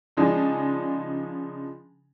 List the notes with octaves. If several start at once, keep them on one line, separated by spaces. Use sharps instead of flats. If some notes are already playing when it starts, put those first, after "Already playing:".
C#3 F3 G#3 D4 D#4